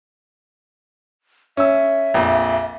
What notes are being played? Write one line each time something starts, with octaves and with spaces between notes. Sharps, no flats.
C#4 E5 E6
A#1 F2